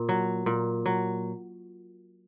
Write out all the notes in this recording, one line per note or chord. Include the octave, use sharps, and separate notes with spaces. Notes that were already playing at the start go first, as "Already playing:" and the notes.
Already playing: A#2
F#3
A#2
F#3